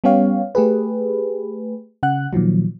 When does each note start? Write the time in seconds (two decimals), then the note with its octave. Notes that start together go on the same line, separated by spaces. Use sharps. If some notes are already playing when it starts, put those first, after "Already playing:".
0.04 G3 B3 C#4 G4 C#5 F5
0.55 A3 G4 G#4 B4
2.03 C#3 F#5 F#6
2.33 A#2 D#3 F3 F#3